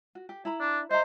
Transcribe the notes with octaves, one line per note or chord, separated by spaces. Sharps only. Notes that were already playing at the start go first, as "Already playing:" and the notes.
F#4
G4
E4 A#5 B5
D4
C5 D#5 E5 A#5